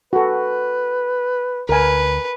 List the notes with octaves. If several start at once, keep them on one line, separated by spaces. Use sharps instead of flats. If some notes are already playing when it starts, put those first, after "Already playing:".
F#4 A4 B4
D2 A#4 B4 G#5